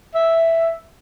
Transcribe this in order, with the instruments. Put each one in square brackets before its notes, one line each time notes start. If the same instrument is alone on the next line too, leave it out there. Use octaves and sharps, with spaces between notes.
[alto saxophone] E5